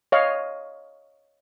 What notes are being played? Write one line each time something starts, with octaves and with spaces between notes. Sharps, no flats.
C#5 D#5 F5